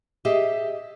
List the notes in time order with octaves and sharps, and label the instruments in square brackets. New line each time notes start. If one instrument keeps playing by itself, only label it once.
[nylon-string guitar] G4 G#4 D#5 E5